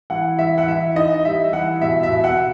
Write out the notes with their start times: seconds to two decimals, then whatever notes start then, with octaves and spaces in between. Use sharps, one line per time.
0.10 E3 F#5
0.38 E3 E5
0.58 F#5
0.67 E3 E5
0.96 D#4 D#5
1.25 G3 E5
1.53 E3 F#5
1.81 B2 E5
2.03 E5
2.09 B2
2.24 F#5